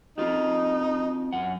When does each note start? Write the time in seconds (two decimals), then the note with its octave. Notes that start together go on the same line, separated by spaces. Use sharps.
0.18 C4 D#4 F4 F#4
1.33 F#2 F#5